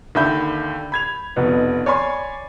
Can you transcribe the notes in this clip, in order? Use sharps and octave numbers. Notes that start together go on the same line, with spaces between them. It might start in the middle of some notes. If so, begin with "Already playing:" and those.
D#2 D3 E5 B5 G6
B5 G#6 F7
F1 B2 D#4 B4 F#5
C#5 D5 G#5 B5 C6